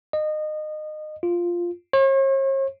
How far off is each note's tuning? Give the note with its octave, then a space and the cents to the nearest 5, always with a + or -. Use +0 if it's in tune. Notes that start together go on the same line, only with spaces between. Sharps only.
D#5 -25
F4 -5
C#5 -45